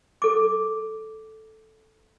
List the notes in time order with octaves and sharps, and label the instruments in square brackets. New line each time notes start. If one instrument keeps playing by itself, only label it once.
[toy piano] A4 D6